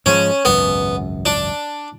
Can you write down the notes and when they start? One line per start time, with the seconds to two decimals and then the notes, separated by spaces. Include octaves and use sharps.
0.06 G#2 F3 G#3 C#4
0.45 G#1 C#2 F#2 B3
1.26 D4